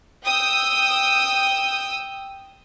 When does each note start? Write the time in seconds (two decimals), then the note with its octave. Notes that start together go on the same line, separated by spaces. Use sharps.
0.24 G5 D#6 E6